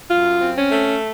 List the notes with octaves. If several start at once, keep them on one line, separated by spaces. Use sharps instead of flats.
F#2 F4
C4
C#4
A3